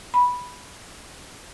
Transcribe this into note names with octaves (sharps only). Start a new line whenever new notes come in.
B5